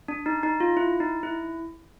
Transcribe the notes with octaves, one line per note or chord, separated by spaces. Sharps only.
D4
D#4
D#4
F4
E4
D#4
E4